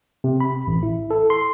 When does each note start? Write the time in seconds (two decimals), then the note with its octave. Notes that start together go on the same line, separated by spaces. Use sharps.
0.24 C3
0.40 B5
0.67 A1
0.83 E4
1.11 A4
1.30 C6